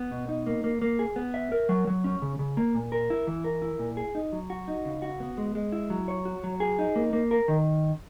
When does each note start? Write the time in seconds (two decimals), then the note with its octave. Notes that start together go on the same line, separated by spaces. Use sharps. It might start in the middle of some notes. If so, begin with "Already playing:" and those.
Already playing: B3
0.11 B2
0.29 D#4
0.46 A#3
0.64 A#3
0.82 A#3
0.99 G#4
1.16 B3
1.34 E5
1.52 A#4
1.69 F#3
1.87 F#3
2.04 C#4
2.22 C#3
2.39 C#3
2.57 A#3
2.74 A#2
2.92 A#4
3.10 E4
3.27 E3
3.44 A#4
3.62 E4
3.79 A#2
3.97 G#4
4.15 D#4
4.32 F#3
4.50 F#4
4.68 D#4
4.85 C#3
5.02 F#4
5.20 B3
5.38 G#3
5.55 G#3
5.72 E4
5.90 F#3
6.08 C#5
6.25 F#4
6.44 F#3
6.60 G#4
6.79 D#4
6.96 A#3
7.13 A#3
7.31 A#4
7.48 D#3